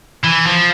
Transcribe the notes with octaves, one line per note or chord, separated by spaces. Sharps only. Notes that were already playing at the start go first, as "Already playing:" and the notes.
E3
F3